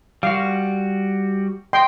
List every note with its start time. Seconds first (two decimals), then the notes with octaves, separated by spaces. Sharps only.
0.23 G3 F#4 F5
1.73 D#5 G5 C6